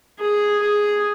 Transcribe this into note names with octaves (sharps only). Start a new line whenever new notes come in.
G#4
G#4